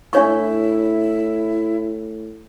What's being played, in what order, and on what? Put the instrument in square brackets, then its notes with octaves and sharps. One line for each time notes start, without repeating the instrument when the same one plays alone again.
[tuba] A2 [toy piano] D4 C#5 C#6 [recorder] E4